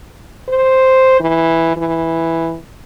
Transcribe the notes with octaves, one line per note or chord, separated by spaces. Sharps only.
C5
E3
E3